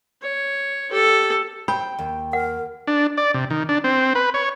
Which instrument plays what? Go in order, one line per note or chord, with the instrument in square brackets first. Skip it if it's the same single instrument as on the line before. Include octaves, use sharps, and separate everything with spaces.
[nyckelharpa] C#5
G4 A4
[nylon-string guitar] C5 [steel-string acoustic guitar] G5 [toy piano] B5
[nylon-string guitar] D#2
[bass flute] A#4 [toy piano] F#5
[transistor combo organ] D4
D5
C3
D#3
D4
C4
B4
C#5